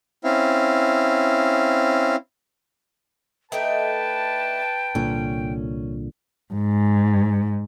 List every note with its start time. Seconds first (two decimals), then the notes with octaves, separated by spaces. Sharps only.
0.24 C4 C#4 E4 F5
3.52 A3 D4 D#4 B4 G5 A5
4.95 C2 A#2 D3 C#4
6.54 G#2